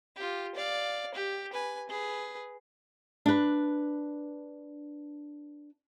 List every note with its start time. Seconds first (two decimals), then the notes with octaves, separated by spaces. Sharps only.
0.16 F4 G4
0.55 D5 F5
1.14 G4
1.53 B4 G#5
1.89 G#4 B4
3.26 D4 B4